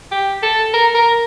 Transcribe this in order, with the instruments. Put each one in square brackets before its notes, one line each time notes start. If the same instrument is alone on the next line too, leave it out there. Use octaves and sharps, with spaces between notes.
[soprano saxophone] G4
A4
A#4
A#4